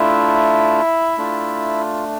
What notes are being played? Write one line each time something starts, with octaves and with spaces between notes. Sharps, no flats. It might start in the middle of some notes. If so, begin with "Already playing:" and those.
Already playing: A3 D4 E4 F4 E5
A3 D4 F4